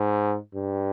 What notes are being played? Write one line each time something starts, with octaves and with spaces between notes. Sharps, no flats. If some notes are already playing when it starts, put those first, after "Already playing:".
Already playing: G#2
G2